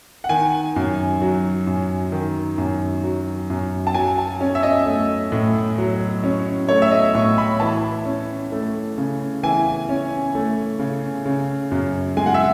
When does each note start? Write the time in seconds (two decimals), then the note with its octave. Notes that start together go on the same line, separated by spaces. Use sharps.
0.24 F#5
0.29 D#3 G#5
0.76 F#2
1.22 F#3
1.67 F#2
2.12 D#3
2.58 F#2
3.04 F#3
3.50 F#2
3.87 A5
3.95 F#3 G#5
4.18 A5
4.41 C#4
4.55 E5
4.63 D#5
4.86 A3
5.32 A2
5.78 F#3
6.24 C#4
6.69 A3 C#5
6.82 E5
6.91 D#5
7.15 A2 C#6
7.38 B5
7.60 E3 A5
8.06 C#4
8.52 A3
8.98 C#3
9.43 E3 G#5
9.89 C#4
10.35 A3
10.79 C#3
11.25 C#3
11.71 F#2
12.17 G#3 G#5
12.26 F#5
12.34 E5